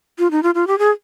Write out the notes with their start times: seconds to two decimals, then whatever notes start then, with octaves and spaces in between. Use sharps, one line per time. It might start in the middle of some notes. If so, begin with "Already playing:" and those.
0.19 F4
0.31 D#4
0.43 F4
0.55 F4
0.67 G4
0.79 G#4